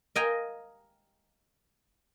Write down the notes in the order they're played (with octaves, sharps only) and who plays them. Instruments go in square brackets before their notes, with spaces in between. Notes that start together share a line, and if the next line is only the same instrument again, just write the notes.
[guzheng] D#5 F5 G5 G#5 A#5